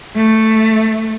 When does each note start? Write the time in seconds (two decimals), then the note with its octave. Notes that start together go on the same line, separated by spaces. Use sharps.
0.16 A3